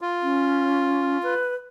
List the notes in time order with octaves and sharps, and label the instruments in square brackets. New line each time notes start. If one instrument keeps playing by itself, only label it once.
[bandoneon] F4
[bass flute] C#4
B4